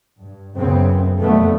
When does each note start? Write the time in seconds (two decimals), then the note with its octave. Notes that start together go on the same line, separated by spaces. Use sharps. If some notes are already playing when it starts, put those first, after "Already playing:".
0.20 G2
0.57 C#2 F#2 C#3 B3 C4
1.20 F2 A#2 D3 G3 A3 B3